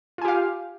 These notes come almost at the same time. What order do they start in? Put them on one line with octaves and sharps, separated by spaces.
F4 G#5 G4 F5